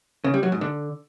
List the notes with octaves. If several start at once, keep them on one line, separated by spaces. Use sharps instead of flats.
C#3
G3
F#3
G#2
D3